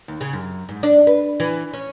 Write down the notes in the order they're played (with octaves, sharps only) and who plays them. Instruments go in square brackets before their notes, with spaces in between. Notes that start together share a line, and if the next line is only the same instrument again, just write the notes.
[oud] D#2
C#3
F#2
G#2
D4
B4
E3
C#4